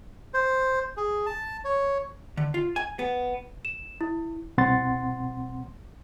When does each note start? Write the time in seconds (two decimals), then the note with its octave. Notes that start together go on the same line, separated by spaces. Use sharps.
0.34 C5
0.97 G#4
1.26 A5
1.65 C#5
2.37 D3
2.54 F4
2.76 G#5
2.99 B3
3.65 E7
4.01 E4
4.58 C2 B2 C4 F#5 C6 A6